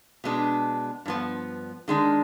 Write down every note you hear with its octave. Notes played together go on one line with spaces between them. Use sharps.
B2 G#3 B3 D4
G2 F3 B3
D#3 G#3 D4